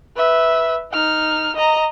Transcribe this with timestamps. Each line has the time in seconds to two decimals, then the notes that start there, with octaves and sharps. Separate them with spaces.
0.16 B4 E5
0.93 D#4 F6
1.56 D#5 A#5